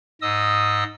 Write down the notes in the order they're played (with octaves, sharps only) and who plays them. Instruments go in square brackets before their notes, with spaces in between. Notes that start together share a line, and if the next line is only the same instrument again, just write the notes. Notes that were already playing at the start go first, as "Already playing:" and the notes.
[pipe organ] G#2 D#5 D#6 E6